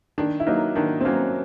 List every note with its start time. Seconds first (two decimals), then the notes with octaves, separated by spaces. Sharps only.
0.18 D#3 D4
0.40 E4
0.47 F#3 A#3 D#4
0.75 D#3 D4
1.01 C4
1.05 F#3 A#3 C#4